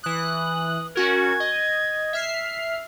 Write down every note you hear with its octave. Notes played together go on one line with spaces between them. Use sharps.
E3 D#6 F#6
C#4 F#4 A#4 G#6
D#5
E5 F6 C7